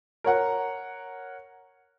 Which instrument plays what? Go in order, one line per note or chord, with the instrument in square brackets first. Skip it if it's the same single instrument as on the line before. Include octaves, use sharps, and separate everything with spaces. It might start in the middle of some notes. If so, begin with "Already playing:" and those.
[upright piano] A#4 C#5 F#5